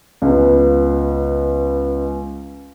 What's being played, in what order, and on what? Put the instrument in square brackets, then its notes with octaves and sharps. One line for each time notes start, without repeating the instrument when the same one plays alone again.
[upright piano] C#2 B3